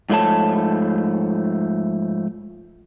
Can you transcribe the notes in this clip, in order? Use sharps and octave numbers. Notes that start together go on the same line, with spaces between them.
G#2 F3 A3 C#5 A5